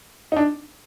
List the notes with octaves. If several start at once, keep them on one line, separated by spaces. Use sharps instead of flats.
D#4
D4